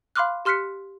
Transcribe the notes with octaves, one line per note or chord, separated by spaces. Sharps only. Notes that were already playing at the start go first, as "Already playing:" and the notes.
F5 B5 C6 D6 F6 F#6
G4 C6 F6 F#6 B6 C#7